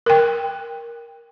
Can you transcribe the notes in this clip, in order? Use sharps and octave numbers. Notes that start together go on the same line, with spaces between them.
A#4 G5